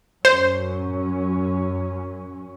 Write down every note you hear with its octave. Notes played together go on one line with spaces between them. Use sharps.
F#2 F#3 C#4 C5